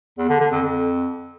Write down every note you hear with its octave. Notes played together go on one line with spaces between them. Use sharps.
E2
D3
D3
F2
F2